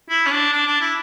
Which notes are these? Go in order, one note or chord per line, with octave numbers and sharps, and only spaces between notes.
E4
C#4
D4
D4
D4
E4